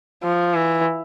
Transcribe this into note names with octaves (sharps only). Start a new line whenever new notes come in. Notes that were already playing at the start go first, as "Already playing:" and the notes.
F3
E3